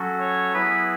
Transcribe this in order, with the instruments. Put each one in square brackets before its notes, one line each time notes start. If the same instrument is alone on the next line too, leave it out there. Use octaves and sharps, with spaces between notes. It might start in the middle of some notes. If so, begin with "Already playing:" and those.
Already playing: [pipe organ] F#3 C#4 F#4 A4
[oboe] C#5
[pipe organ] F#3 B3 E4 G#4 [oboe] B4